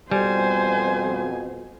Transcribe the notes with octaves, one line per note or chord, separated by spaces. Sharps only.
F2 B2 G3 C5 G#5